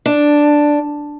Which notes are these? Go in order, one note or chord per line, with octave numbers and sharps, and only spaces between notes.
D4